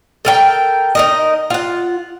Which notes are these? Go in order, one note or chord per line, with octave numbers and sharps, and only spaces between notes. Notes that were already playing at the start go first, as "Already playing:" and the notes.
A4 A#4 G5
D#4 A#4 D#5
F4 F#5